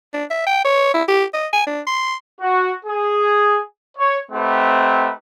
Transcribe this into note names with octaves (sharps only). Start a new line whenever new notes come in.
D4
E5
G5
C#5
E4
G4
D#5
G#5
D4
C6
F#4
G#4
C#5
A3 C4 D#4 G4 B4 F#5